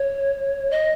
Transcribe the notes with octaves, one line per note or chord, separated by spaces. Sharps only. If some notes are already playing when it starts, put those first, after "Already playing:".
Already playing: C#5
D#5